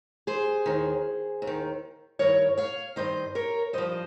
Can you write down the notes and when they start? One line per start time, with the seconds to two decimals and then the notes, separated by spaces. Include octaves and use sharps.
0.27 G#4 C5
0.66 D#2 D#3
1.42 D#2
1.47 D#3
2.19 G2 D#3 A#4 C#5
2.58 C#5 F5
2.96 G2 D#3 C5 D#5
3.35 A#4 C#5
3.73 G2 F3 C5 D#5